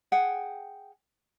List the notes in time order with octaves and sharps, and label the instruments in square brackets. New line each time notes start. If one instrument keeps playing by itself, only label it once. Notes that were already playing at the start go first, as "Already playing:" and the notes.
[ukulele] G#4 F#5 G5